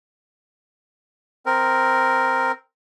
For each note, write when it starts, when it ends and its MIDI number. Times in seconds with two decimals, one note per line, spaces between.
1.46 2.52 60
1.46 2.52 70